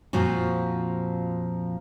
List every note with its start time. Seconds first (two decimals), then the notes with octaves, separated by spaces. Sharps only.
0.13 F2 A#2 F3 F4 F#4